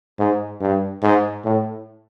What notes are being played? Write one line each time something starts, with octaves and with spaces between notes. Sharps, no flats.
G#2
G2
G#2
A2